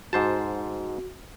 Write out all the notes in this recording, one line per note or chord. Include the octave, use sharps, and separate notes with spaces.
G#2 F#4 C5 A5